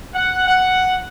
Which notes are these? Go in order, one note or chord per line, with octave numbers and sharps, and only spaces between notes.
F#5
F#5